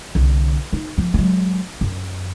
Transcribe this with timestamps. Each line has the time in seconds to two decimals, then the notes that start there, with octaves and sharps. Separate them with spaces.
0.15 C2 D3
0.73 D#4
0.98 F3 C4
1.14 F#3 G#3
1.81 F#2